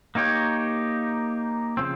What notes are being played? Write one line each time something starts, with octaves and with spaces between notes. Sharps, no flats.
A#3 D#4 G4 C#5
C#3 F3 C4